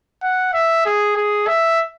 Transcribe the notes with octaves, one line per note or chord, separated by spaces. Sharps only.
F#5
E5
G#4
G#4
E5